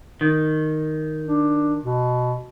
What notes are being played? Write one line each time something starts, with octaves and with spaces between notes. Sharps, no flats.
D#3
D4
B2